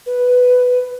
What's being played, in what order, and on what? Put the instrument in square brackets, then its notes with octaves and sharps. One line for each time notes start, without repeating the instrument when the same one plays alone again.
[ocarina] B4